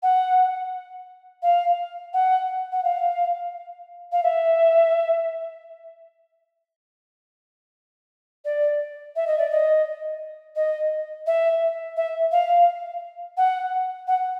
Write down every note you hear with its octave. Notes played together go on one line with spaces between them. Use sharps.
F#5
F5
F#5
F#5
F5
F5
E5
D5
E5
D#5
D5
D#5
D#5
E5
E5
F5
F#5
F#5